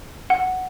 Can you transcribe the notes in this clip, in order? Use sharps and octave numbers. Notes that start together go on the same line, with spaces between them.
F#5